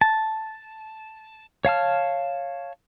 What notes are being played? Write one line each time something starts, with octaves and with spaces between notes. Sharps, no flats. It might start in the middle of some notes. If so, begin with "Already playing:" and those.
A5
C#5 F5 A5 F6